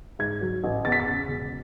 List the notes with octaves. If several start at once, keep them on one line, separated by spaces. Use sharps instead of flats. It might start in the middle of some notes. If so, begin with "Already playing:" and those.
G#2 G#6
F#3
A1
E2 A6
B6
A6
C#3
E1